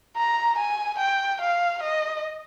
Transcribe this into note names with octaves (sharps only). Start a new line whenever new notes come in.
A#5
G#5
G5
F5
D#5